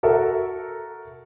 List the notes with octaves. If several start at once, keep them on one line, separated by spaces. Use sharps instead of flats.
F#4 A4 A#4 E5